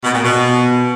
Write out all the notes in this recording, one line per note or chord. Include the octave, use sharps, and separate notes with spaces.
B2
A#2
B2